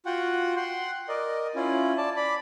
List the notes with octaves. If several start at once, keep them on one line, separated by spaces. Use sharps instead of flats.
F4 F#4 F#5 G5
F#5 G5 C6
A#4 D5 D#5
C#4 E4 F4
D5 A5
D5 B5